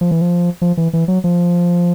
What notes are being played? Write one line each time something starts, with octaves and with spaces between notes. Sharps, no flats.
F3
E3
F3
F3
E3
E3
F#3
F3